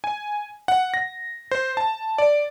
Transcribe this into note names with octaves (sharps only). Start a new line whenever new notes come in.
G#5
F#5
A#6
C5
A5
D5